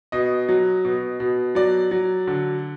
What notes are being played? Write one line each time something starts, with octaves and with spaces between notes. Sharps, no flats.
B2 D#5
F#3
B2
B2
F#3 D5
F#3
D3